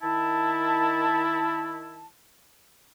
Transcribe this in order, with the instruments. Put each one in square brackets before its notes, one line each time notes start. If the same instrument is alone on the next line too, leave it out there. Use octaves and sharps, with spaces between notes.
[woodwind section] D#3 E4 A5